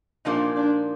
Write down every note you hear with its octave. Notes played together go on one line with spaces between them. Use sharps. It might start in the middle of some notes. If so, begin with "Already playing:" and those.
A#2 F3 A#3 D4 D#4
D4